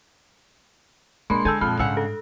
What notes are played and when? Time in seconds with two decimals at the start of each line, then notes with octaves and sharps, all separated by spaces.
1.30 B2 G#3 A#3 D4 B5 C6
1.45 D3 A4 G#5 E6 G6 G#6
1.61 F2 A#2 B5 F6 F#6
1.79 G#2 C#3 G3 F#5 E6
1.97 A4